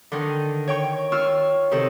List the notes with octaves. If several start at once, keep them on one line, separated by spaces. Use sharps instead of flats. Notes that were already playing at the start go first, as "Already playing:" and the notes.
D3 D#3
C#5 G5 C#6
F4 C#6 E6 F6
C3 D#3 A4